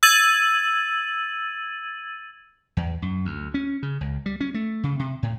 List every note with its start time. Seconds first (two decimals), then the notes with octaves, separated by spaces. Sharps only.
0.03 E6 G#6 A6 D#7 F#7
2.77 E2
3.02 F#2
3.25 D2
3.54 C#4
3.83 C#3
4.01 C#2
4.26 G3
4.41 C#4
4.54 A3
4.83 C#3
4.99 C3
5.23 A2